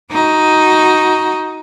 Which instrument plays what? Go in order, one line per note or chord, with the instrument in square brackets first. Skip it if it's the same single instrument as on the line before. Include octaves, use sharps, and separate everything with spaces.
[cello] D#4 F#4